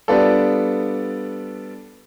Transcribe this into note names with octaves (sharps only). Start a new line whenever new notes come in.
G3 B3 D4 F4 A4